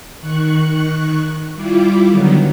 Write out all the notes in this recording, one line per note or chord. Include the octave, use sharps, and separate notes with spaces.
D#3 C#6 F#6
G3 E4 F4 D6
D3 D#3 F#3 B3